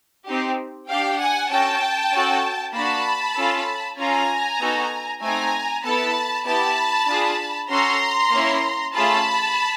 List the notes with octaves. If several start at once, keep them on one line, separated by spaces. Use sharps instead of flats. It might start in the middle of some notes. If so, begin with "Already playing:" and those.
C4 D#4 G4
D4 G4 F5 G5
F#5 G#5
C#4 F#4 A4 G5 A5
C#4 F#4 A4
A#3 D4 F#4 A5 B5
C#4 F4 A4
C#4 F4 A4 G#5 A#5
B3 D#4 F#4 A4
A3 C4 D#4 G#5 A#5
B3 E4 A4 A5 B5
B3 E4 G4 A5 B5
D4 F4 G#4
C#4 F#4 A4 A#5 C6
A#3 C#4 E4
A3 C#4 F4 G#4 A5 B5